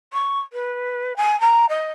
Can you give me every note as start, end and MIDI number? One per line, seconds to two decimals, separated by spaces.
0.13 0.40 85
0.53 1.16 71
1.16 1.39 80
1.40 1.65 82
1.69 1.91 75